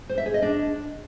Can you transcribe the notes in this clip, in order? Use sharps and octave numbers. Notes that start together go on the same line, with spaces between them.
C5
E5
G#4
D#5
D4